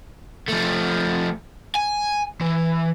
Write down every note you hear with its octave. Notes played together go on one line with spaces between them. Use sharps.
F3 A3
G#5
E3